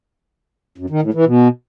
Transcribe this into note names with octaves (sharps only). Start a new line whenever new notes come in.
F#2
D#3
A2
E3
B2